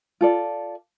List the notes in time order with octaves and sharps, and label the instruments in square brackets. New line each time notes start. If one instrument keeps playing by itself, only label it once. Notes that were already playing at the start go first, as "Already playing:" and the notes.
[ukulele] F4 A4 D5